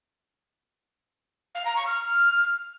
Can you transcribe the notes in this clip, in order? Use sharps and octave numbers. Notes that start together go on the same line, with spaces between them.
F5
A#5
C#6
F6